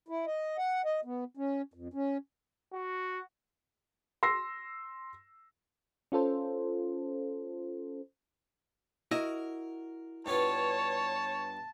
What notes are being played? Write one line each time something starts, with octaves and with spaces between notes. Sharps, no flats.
E4
D#5
F#5
D#5
B3
C#4
F2
C#4
F#4
C6 E6 A#6 C7
C#4 F4 A4 C5
E4 F#4 A#4 D#5
G2 B3 F4 C#5 A5